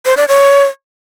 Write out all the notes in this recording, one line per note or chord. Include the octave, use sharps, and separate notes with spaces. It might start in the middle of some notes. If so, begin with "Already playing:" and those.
C5
D5
C#5